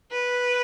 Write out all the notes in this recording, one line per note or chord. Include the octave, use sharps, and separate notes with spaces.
B4